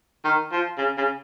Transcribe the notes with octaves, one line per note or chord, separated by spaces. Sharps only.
D#3
F3
C#3
C#3